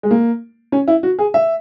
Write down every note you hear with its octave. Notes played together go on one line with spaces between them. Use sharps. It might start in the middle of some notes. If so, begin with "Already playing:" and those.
G#3
A#3
C#4
E4
F#4
G#4
E5